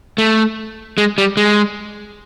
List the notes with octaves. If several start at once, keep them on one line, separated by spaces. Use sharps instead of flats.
A3
G#3
G3
G#3